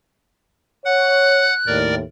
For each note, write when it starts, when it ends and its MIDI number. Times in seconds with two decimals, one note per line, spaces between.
0.85 1.48 73
0.85 1.54 78
0.85 1.76 90
1.67 2.01 39
1.67 2.01 45
1.67 1.95 70
1.67 1.95 74